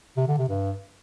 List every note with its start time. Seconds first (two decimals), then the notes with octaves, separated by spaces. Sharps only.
0.17 C3
0.27 D3
0.38 C3
0.48 G2